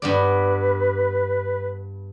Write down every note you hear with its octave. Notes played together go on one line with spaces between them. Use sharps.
G2 B3 B4 D5